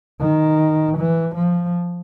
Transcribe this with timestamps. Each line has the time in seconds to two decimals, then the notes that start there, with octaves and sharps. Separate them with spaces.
0.21 D#3
0.98 E3
1.36 F3